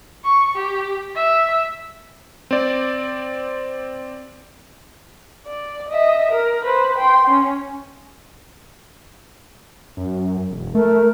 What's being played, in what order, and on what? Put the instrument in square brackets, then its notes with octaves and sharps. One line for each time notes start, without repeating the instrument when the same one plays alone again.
[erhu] C#6
G4
E5
[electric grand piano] C4 D5
[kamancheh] D5
D#5 E5
A#4
B4 C5
G5 C6
C#4
[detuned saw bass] F#2
E1
[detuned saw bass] A3 [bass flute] A#4